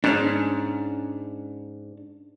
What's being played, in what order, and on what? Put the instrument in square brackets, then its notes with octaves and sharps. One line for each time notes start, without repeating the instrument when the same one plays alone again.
[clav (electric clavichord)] G#2 [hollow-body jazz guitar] C#4 D4